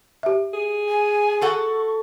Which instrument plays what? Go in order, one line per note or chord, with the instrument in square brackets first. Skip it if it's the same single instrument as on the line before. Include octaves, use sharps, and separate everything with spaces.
[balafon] G4 E5
[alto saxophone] G#4
[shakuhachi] G#5
[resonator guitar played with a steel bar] F#4 A4 F#5 [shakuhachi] C#6